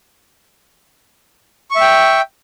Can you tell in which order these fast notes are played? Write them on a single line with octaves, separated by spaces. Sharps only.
C#6 E5 G5